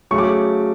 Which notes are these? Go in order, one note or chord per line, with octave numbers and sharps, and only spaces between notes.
C#3 F#3 A3 C#6
D6